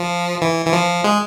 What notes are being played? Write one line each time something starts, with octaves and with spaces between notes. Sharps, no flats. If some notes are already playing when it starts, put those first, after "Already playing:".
Already playing: F3
E3
E3
F3
G#3